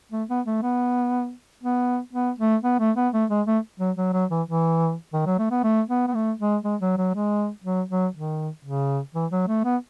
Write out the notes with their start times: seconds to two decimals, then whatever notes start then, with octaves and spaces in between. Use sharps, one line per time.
0.12 A3
0.29 B3
0.46 A3
0.62 B3
1.63 B3
2.13 B3
2.38 A3
2.63 B3
2.80 A3
2.96 B3
3.13 A3
3.30 G#3
3.46 A3
3.80 F#3
3.97 F#3
4.13 F#3
4.30 E3
4.47 E3
5.13 D#3
5.26 F#3
5.39 A3
5.51 B3
5.63 A3
5.89 B3
6.07 B3
6.14 A3
6.39 G#3
6.64 G#3
6.81 F#3
6.97 F#3
7.14 G#3
7.64 F#3
7.89 F#3
8.14 D#3
8.65 C#3
9.14 E3
9.31 F#3
9.48 A3
9.64 B3